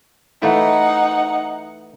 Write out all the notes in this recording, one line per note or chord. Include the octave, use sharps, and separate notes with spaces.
E3 A3 D#4 E4 F#5